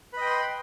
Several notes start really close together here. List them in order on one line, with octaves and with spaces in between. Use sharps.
B4 D#5 G5 C6 B5